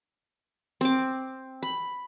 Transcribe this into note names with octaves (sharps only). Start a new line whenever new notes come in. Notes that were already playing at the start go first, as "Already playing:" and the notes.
C4 D6
B5